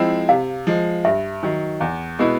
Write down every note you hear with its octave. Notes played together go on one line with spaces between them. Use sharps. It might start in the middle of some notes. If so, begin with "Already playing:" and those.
Already playing: F3 G#3 C4 E4
C3 F5
F3 G#3
G2 E5
D#3 F#3
E2
B2 G#3 B3 E4